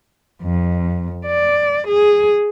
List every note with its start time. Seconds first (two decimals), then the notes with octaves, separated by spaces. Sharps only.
0.42 F2
1.27 D5
1.88 G#4